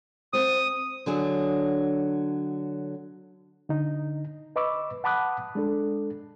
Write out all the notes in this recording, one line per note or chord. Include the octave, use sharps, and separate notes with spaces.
C4 C5 D#6
D3 F#3 D4 G#4
D3 D#4
B4 D#5 B5 C#6 D6 E6
F#5 A5 B5 D6 D#6 F#6
G#3 D4 A4